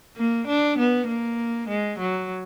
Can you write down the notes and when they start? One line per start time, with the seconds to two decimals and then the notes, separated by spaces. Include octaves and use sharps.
0.16 A#3
0.47 D4
0.78 B3
1.08 A#3
1.68 G#3
1.98 F#3